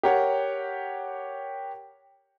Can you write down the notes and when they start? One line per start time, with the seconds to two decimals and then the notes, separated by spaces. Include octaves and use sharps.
0.03 G4 A#4 C#5 F#5